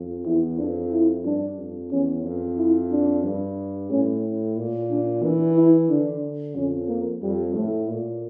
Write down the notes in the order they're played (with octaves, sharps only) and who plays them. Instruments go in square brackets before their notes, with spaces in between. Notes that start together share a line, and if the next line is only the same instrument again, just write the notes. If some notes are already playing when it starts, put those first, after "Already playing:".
Already playing: [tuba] F2
[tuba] E2 [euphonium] E4
[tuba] F2 [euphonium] D4
[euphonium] E4
[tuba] G2 [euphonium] D4
[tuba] F2
[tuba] E2 [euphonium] C#4
[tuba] F2
[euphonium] E4
D4
[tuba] G2
[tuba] A2 [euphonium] C#4
[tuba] A#2
[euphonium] D4
[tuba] E3 [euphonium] D4
[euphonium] E4
[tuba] D3 [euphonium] D4
[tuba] F2 [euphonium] C#4
[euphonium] A#3
[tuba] F2 [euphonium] G3
[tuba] A2 [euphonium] A3
[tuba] A#2